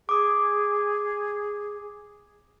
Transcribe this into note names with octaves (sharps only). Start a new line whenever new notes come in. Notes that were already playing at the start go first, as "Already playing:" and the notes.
G#4 D6 D#6